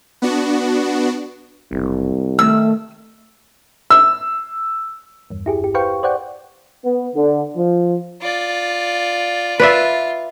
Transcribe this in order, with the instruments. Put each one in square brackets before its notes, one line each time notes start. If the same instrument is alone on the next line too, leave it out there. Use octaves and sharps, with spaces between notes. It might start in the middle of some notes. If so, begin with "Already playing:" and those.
[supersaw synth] B3 D4 F#4
[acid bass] F#1 [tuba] C2
[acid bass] D#3 [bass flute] A3 [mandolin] E6
[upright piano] E6
[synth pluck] E2 G2
E4 G4 G#4
G1 G4
B4 C5 F5 G5 C#6
C5 D5 F#5 G5
[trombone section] B3
D3
F3
[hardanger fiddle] F4 D5
[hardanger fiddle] F4 [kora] B4 D5 E5